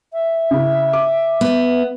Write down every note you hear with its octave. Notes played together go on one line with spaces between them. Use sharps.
E5
C#3 E4
D6
B3